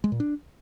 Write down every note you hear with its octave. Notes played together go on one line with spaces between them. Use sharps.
G#3
A#2
D4